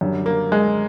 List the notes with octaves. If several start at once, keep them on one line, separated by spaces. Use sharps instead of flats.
F#2 D3 G3
A#3
G#3